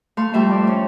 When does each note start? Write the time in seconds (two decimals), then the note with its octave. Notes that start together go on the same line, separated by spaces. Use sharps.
0.17 A3 F5 C6
0.34 F2 G3 A3 E5
0.51 D5
0.67 C#4